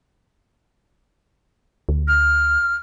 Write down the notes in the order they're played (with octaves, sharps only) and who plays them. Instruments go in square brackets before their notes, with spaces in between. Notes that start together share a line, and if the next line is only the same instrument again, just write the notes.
[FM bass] D2
[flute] F6